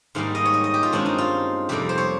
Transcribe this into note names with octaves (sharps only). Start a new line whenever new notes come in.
G#2 D#3 G3 A#3 F5
D#5
C#5
D#5
D#5
G4
F4
G2 D#3 G#3 C4 C#4
D#4
F4
F2 C3 G3 A#3 G4
C5
C#5